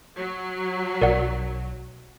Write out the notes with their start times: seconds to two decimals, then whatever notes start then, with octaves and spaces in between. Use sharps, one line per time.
0.18 F#3
1.01 B1 A#4 D5 F#5